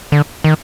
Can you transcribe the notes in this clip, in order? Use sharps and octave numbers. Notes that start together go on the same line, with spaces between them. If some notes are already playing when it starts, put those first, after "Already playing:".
D3
D#3